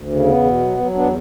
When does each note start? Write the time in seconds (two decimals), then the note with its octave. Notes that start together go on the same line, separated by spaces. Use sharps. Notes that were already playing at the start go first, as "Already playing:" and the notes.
Already playing: D2
0.09 C#3
0.26 E2 B3
0.44 B2
0.60 F#3
0.78 F#3
0.95 E2 B3 D4